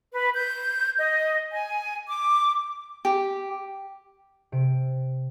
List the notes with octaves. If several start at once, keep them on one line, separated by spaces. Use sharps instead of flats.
B4
G6
D#5
G#5
D6
G4
C3 D7